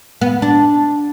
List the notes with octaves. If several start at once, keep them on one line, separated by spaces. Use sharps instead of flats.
B3
D4